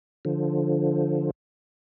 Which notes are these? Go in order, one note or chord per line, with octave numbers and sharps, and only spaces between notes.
D3 F3